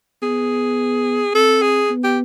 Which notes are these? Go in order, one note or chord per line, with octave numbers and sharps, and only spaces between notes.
B3 G#4
C4 A4
G#4
B3
G4